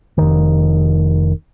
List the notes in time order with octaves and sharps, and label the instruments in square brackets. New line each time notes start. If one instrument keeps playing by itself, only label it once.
[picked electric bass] F1 D#3